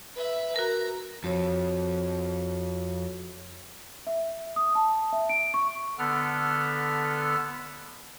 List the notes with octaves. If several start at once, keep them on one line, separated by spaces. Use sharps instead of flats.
B4 E5
F#4 A#4 A#5
F2 F#4 C#5
E5
D#6
A5
E5
D7
C#6
D3 B3 A4 F6